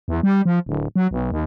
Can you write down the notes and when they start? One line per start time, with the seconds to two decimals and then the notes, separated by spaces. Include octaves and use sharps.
0.08 E2
0.23 G3
0.45 F3
0.66 D1
0.96 F#3
1.11 B1
1.31 D#2